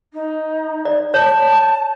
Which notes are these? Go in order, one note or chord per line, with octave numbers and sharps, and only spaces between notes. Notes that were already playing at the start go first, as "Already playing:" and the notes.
D#4
D5
C#5 A5